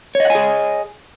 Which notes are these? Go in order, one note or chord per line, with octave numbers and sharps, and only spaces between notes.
G#4 C#5 D#5 F#5 G#5